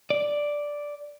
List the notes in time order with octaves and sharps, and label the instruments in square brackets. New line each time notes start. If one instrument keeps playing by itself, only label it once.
[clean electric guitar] D5